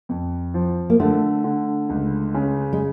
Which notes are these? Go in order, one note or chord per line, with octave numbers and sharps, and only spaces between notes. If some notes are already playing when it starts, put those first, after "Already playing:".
F2
F3
A#3
D3 A3
D3
C#2
C#3
G#3